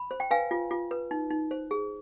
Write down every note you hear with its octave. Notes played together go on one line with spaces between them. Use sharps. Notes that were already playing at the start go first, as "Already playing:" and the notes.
Already playing: B5
C5
G5
B4 F5 G#5
F4
F4
B4
D#4
D#4
C5
G#4